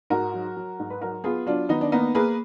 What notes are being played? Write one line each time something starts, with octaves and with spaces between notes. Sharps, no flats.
G#2 F#4 A#4
F#3
F#3
G#2
B4
F#3 F#4 A#4
B3 F4 G#4
F#3 D4 F4
D#3 B3 D#4
D4
A#3 B3 D#4
A#3 G#4 B4